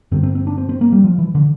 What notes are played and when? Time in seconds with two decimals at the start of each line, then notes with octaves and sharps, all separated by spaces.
0.11 G2 D3 C4
0.23 C4
0.35 C4
0.47 D4
0.58 C4
0.69 C4
0.81 A#3
0.92 G3
1.04 F3
1.19 E3
1.35 D3